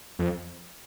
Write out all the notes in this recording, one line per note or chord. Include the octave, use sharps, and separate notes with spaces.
F2